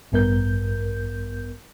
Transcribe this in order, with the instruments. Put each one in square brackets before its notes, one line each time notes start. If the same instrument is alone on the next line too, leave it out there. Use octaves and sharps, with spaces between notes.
[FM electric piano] A1 G2 B3 A#4 G6